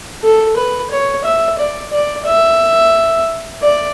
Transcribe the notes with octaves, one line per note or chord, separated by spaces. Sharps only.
A4
B4
C#5
E5
D5
D5
E5
D5